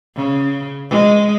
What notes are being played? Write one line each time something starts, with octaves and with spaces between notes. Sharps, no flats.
C#3
G#3